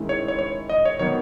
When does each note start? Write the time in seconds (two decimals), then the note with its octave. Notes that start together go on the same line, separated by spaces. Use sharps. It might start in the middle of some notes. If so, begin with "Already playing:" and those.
Already playing: D#3 G#3 C#4 E4
0.09 C#5
0.28 C#5
0.39 C#5
0.69 D#5
0.85 C#5
0.99 D#3 F#3 B3 C#5